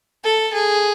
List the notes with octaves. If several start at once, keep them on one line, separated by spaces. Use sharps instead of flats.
A4
G#4